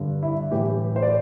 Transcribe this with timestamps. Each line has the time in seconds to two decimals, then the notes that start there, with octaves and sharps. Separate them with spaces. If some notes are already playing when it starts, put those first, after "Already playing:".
Already playing: G2 D3
0.23 E4
0.51 A2 E3 G4
0.96 C5
1.02 D5